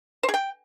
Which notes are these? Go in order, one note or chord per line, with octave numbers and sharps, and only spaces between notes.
C5
G#4
G5